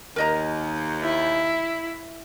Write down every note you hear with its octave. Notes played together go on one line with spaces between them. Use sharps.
D#2 A#4 D#5 A#5
E4